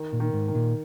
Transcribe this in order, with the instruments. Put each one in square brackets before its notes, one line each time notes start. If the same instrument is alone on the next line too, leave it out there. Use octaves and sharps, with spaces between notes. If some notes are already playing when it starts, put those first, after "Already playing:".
Already playing: [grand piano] D#3
[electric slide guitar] A#2
[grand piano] D#3
[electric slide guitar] G#2
[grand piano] D#3
[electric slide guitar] A#2